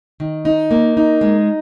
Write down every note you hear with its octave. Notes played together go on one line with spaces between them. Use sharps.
D#3
D#4
A#3
D#4
G#3